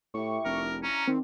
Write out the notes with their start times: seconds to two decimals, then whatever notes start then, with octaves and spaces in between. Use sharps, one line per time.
0.14 A2 E4 G4 C#6 D6
0.45 F1 D4 A#4
0.83 C#4 F5 A#5
1.08 D#3 C4